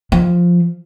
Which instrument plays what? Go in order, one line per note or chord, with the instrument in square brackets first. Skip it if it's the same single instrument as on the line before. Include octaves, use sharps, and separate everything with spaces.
[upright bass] F3